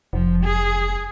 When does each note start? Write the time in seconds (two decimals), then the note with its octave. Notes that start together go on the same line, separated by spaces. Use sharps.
0.13 F1 F3
0.44 G#4